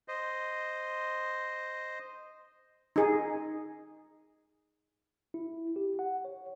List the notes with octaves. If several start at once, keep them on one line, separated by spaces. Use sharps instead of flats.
C5 D#5
D#4 G#4
E4
G4
F#5
C#5